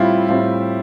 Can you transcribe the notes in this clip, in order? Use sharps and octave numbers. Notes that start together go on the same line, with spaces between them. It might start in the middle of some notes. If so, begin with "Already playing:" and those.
Already playing: A2 G3 C4 E4 F4 G4 E5
A2 G3 C4 F4